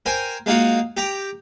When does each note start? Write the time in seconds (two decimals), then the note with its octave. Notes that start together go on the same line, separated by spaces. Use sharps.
0.06 A#4 C5 G5 G#5
0.46 G#3 A#3 D#4 F4 F#4
0.97 G4 G5 A#5